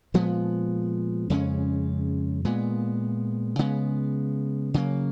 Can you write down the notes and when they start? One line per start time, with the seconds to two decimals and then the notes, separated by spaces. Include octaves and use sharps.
0.14 A#2 F3 G#3 B3
1.30 F2 C#3 G#3 C#4
2.45 A#2 G#3 B3
3.59 C#3 G#3 B3
4.74 C#3 F#3 A#3